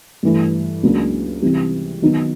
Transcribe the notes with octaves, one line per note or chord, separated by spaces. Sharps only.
G2 E3 A3
C#2 C#3 F#3 A#3 D4
C3 E3 G3
D#3 F#3 B3 D#4